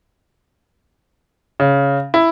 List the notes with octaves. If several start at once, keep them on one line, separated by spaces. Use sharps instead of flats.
C#3
E4